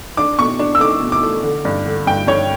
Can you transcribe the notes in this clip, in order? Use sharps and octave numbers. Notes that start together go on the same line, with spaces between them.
D4 D6
B2 C#6
D4
E6
A3 D6
B2
D6
A3
D3
G2
D3
G2 G5
G2 C#5